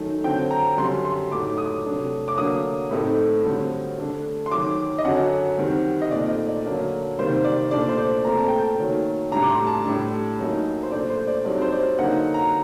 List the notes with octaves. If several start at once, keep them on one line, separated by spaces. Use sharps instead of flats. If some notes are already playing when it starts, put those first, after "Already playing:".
Already playing: F#2 D#3 A3 D#4
D3 F#3 C4 G5
A#5
F#2 D3 G3 C6
C6
A2 F#3 A3 D#4 D6
D#6
C3 F#3 A3 D4
D6
D3 F#3 A#3 D4 D#6
A2 A3 C4 D#4
G2 D3 F#3 C4
D3 A3 D4
C6
F#2 D#3 F#3 D6
D#5
F#2 D3 F#3 F#5
D#3 G3 C4
D#5
A#2 A3 C4 D#4 D5
D#5
D5
D3 F#3 A#3 D4
C3 D#3 G3 A#3 C5
D5
A#2 A3 D4 D5
C5
D5
A#2 A3 C4 A#5
A5
G5
A5
F#2 D#3 F#3 A#3
A2 G3 D4 A#5
D6
C6
A5
A2 G3 D4
F#2 F#3 A#3 D#4
C5
A#2 A3 D4 D5
C5
D5
G2 F#3 C4 D#4 D5
C5
D5
D3 F#3 A#3 D#4 F#5
A#5